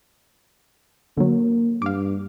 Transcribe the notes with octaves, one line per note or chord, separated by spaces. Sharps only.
D3 F#3 A#3
G2 F5 D6